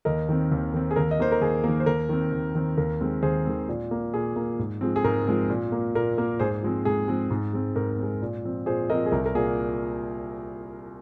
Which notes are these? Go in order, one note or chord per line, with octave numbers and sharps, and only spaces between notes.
D#2 A#4 D#5
D#3 C4
D#2
D#3 C4
G#4
D#2 A#4
D#5
D#3 A#3 C5
A#4
D#2 G#4
D#3 A#3
C5
D#2 A#4
D#3 C4
D#2
D#3 C4
D#2 A#4
D#3 G#3 C4
D#2 G#4 C5
D#3 G#3 C4
A#2
A#3
A#2 G#4
A#3
G#2
F3 G#3 C4
G#4
G#2 A#4
F3 G#3 C4
A#2
A#3
A#2 A#4
A#3
G#2 G#4 C5
F3 G#3 C4
G#2 G#4
F3 G#3 C4
G#2
G#3 C4
G#2 A#4
G#3 C4
A#2
F3 C4
A#2 G#4 C5
F3 C4 A#4 D#5
G#4
C2 A#4
A#4
A#2 A#3 G#4